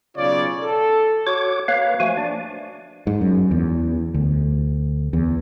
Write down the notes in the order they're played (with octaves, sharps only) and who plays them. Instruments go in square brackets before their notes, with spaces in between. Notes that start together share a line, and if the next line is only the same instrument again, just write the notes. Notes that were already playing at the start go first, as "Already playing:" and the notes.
[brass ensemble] B1 C#3 F4 C#5 D5
A4
[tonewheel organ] F#4 C#5 D6
A#3 B4 C#5 F5
F3 A3 A#3 F#4 G#5
D4 D5
[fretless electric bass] G#2
F#2
E2
D2
E2